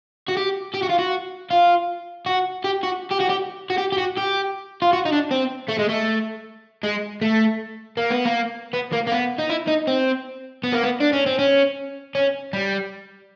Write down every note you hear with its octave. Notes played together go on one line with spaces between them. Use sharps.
F#4
G4
G4
F#4
F4
F#4
F4
F#4
G4
F#4
G4
F#4
G4
F#4
G4
G4
F#4
G4
F4
F#4
D#4
D4
C4
A3
G#3
A3
G#3
A3
A#3
B3
A#3
B3
A#3
A#3
B3
D#4
E4
D#4
C4
B3
A#3
B3
D4
C#4
C4
C#4
C#4
G3